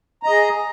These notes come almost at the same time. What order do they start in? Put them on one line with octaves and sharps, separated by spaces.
A#5 D#5 G#4